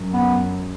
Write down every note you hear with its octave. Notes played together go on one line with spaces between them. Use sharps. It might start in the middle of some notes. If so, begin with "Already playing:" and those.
Already playing: F#2
B3